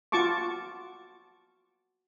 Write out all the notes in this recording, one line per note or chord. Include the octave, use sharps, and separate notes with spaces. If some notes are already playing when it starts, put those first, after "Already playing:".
F4 F#4 A5 C#6 D6